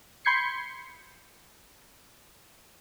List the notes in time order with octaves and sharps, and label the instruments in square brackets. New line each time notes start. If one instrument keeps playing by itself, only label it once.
[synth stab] B5 C6 G6 G#6 C7 C#7